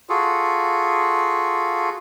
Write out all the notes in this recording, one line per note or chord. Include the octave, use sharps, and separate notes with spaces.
F4 F#4 G#4 A4